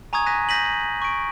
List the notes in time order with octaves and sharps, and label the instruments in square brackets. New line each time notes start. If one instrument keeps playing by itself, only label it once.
[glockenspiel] G#5 A#5 C#6 D#6 G#6
G#5 F#6 A#6 B6 D#7
G6 A#6 B6 D#7 F#7
C#6 D7